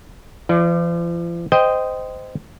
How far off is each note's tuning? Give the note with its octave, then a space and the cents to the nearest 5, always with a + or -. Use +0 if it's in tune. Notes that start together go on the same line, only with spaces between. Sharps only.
F3 -45 D5 +25
C5 -20 D#5 +0 G5 +0